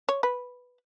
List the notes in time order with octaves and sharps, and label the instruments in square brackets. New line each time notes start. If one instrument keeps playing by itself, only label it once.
[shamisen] C#5
B4